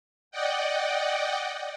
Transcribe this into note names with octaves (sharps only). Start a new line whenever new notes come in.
D5 D#5 F#5 G5